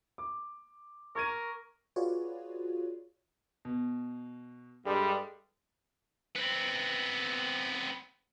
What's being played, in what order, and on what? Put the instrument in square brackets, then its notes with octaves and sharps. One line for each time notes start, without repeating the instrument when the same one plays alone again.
[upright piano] D6
[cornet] A#4 [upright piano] C#6 G#6 D#7
[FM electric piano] F4 F#4 G#4 B4 C#5 D5
[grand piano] B2
[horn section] G2 G#3 [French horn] G3 [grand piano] A4
[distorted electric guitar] B3 C4